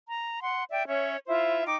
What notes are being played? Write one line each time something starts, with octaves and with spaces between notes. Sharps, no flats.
A#5
F#5 C6
D5 E5 G5
C#4 C#5 E5
E4 F4 C5 E5
D#4 G5 D6